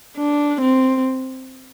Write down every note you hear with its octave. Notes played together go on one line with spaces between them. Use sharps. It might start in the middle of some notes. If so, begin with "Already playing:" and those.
D4
C4